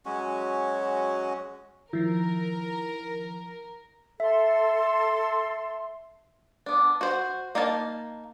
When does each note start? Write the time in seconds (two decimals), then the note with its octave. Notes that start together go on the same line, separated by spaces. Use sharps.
0.06 F#3 G#3 C#4 F#4
1.93 D#3 F3 E4 A#4
4.20 A4 E5 C6
6.66 B3 D4
7.01 F#4 C5
7.55 A#3 D#4 F5 A5